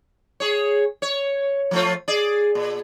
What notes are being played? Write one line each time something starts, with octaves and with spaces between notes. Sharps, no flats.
G#4 C#5
C#5
F3 A3 F4
G#4 D5
A#2